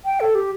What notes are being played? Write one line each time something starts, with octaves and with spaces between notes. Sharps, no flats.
G5
A4
G4